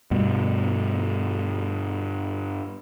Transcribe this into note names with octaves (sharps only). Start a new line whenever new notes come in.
G2 B2